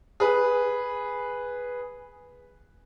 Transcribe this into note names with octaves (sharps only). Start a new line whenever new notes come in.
G#4 B4